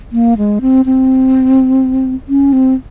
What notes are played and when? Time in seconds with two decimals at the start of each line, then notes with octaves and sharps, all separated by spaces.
0.12 A#3
0.38 G#3
0.61 C4
0.85 C4
2.29 C#4
2.53 C4